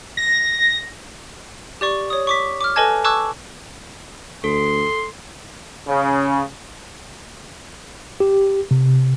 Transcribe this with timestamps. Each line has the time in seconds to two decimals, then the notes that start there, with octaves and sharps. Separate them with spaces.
0.17 A#6
1.81 G4 D5 C#6
2.10 C#5 D#6
2.27 C#6 D6 B6
2.61 D6 F6
2.76 A4 B4 D#5 G#5 A5 G#6
3.04 A5 C#6 D6 E6 F#6 G#6
4.44 D2 A4 C6
5.87 C#3
8.20 G4
8.71 C3